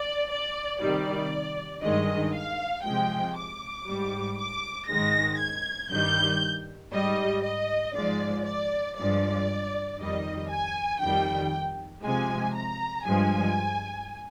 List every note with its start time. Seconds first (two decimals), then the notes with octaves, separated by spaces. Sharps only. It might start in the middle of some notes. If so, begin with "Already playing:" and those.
Already playing: D5
0.30 D5
0.81 C3 D#3 G3 D5
1.83 G2 D#3 G#3 D#5
2.34 F5
2.84 C3 F3 G#3 G5
3.36 D6
3.87 G#2 G3
4.38 D6
4.89 G#2 D#3 G#3 A#6
5.40 G#6
5.91 G2 D#3 G3 G6
6.93 G#2 G3 D#5
7.44 D#5
7.95 G#2 F3 G#3 D5
8.47 D5
8.98 G2 F3 G#3 D5
9.99 F2 D#3 G3 D#5
10.50 G#5
11.02 F2 D#3 G3 G5
12.04 C3 F3 G#3 G#5
12.55 A#5
13.06 G2 F3 G#3 G#5